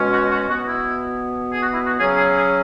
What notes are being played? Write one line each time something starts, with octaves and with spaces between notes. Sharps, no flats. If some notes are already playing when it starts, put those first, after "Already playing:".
Already playing: B2 G#3 C#4
F#4
F#4
B2 B3 F#4
E4
G#4
F#4
E4
F#4
C#3 F#3 C#4 G#4
G#4
G#4